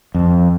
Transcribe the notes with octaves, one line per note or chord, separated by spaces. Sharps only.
F2